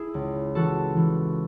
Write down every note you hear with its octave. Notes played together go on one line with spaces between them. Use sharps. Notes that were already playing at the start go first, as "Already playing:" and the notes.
Already playing: E4 G#4
C#2
E3 F#4 A4
E3